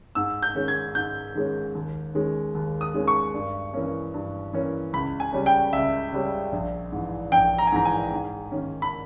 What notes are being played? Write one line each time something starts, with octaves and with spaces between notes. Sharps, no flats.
G#2 E6
G6
D#3 G#3 C#4
G#6
G#2 G6
D#3 G#3 C#4
D#2
D#3 G#3 C#4
D#2
D#6
D#3 G#3 C#4
C#6
G2
E3 A#3 C#4
G2
E3 A#3 C#4
C#2 B5
G#5
C#3 G3 C#4
G5
C#2 E5
C#3 G3 C#4
A#1
G#2 E3
A#1 G5
A#5
G#5
G#2 E3 A#5
G#5
G#2
D#3 A#3 C#4
B5